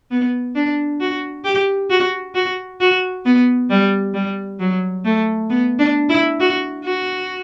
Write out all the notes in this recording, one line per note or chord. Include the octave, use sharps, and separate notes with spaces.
B3
D4
F#4
G4
F#4
F#4
F#4
B3
G3
G3
F#3
A3
B3
D4
E4
F#4
F#4